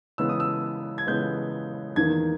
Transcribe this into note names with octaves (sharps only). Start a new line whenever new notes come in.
C#3 E3 G#3 B3 E6
D#6
E6
G#6
C#3 E3 G#3 B3 G6
E2 D#3 A#3 G#6